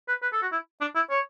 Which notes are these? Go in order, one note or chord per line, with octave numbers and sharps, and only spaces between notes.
B4
B4
A4
F#4
E4
D4
E4
C#5